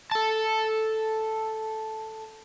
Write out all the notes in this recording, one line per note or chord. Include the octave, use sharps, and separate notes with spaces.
A4 A5